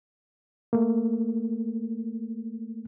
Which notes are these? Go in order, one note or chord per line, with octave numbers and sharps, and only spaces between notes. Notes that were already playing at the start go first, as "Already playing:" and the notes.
A3 A#3